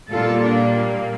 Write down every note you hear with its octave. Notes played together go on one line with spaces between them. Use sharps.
A#2 G3 A#3 F4 A4
D4